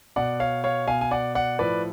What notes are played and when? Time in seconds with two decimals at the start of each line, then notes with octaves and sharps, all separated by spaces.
0.16 B2 D5 F#5
0.40 C#5 F5
0.64 C#5 F5
0.88 B2 F5 G#5
1.01 G#5
1.11 D5 F#5
1.35 D5 F#5
1.59 A2 F3 B4 D5